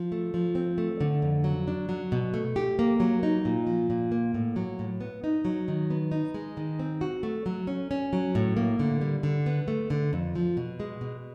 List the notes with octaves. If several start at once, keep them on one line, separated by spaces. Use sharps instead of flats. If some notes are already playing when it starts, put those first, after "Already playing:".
Already playing: F3
A3
F3
C4
A3
D3
F2
F#3
D4
F#3
B2
A3
G4
A#3
F#3
D#4
A#2
F3
A#2
A#3
A2
F#3
A2
B3
D#4
F#3
D#3
B3
D#4
G#3
D#3
C4
F#4
A3
F#3
C#4
C#4
F#3
A2
A#3
D3
G3
D3
B3
A3
D3
F2
F3
B2
G#3
B2